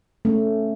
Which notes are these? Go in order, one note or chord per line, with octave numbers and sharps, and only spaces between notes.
A3 C#4